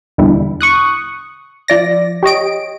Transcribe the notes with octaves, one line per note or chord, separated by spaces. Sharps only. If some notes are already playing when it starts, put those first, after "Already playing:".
E2 B2 D3 G3 E4
C#6 D#6 F#6
F3 D5 A#6
G4 C#5 D#5 D7